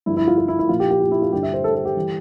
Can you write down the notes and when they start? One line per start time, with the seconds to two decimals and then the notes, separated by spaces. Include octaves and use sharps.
0.06 G2 D3 F3 E4
0.17 E4
0.28 F4
0.38 F4
0.48 E4
0.59 E4
0.69 A#2 F3 F4
0.80 G4
0.91 G4
1.01 F4
1.11 E4
1.22 F4
1.33 G2 D3 G3 G4
1.43 E5
1.54 C5
1.64 A4
1.75 A4
1.85 G4
1.97 E3 G3